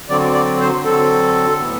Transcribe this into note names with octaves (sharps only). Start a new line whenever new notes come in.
D3 F#3 C4 D5
D5
C5
D3 F#3 C4 A4
A2 E3 B3